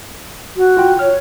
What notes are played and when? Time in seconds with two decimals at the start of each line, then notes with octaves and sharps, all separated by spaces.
0.56 F#4
0.77 F4 G5
0.99 C#5 F6